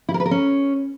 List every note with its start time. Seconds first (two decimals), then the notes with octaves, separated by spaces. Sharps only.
0.09 E4
0.14 A#4
0.20 B4
0.26 A#4
0.31 C#4